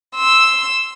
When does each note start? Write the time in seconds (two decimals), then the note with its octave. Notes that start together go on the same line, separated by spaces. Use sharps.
0.16 C6 E6